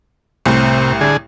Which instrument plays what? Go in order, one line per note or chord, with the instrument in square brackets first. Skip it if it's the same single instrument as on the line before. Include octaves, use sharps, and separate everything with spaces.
[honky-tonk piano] C2 A2 [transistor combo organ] C3
[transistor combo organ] D3 G#4